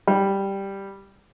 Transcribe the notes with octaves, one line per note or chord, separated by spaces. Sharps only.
G3